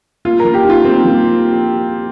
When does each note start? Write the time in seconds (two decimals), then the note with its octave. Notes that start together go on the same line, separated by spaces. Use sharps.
0.25 A#3 F4
0.40 F3 A#4
0.54 G4
0.65 D#4
0.70 F4
0.84 A#3 C4
1.05 F3